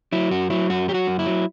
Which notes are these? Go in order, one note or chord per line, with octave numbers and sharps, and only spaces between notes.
F#3 E4
F#2 F#4
F#3 E4
F#2 F#4
F#3 G4
F#4
F#2
E4
F#3